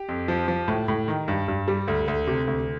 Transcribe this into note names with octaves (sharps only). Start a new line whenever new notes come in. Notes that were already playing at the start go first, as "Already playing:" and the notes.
Already playing: G4
F2
F3
F3
A2
A2
D#3
G2
G2
G3
D2
D2
C3
D2